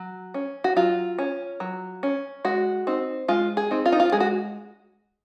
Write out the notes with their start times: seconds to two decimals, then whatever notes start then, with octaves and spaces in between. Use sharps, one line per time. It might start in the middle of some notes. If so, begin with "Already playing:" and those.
Already playing: F#3
0.34 C#4
0.64 F#4
0.76 F#3 F4
1.18 C#4
1.60 F#3
2.03 C#4
2.45 G#3 F#4
2.87 C4 D#4
3.28 G#3 F4
3.57 G#4
3.71 C4 D#4
3.86 F4
3.92 D#4
4.00 F4
4.12 G#3 G#4
4.20 F#4